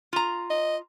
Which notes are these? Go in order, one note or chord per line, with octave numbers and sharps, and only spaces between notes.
F4 A#5
D#5